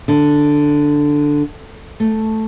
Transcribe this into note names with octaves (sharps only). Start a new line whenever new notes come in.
D3
A3